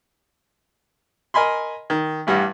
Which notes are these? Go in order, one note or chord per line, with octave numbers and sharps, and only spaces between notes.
A#4 D#5 G#5 B5 C6
D#3
A1 G2 G3 F#5